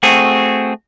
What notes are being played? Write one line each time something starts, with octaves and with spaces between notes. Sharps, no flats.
A3 C4 F#4 G#4